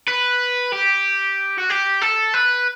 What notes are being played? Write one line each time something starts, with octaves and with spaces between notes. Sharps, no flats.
B4
G4
F#4
G4
A4
B4